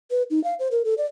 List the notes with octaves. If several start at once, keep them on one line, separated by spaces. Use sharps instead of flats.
B4
D#4
F5
C5
A#4
A4
D5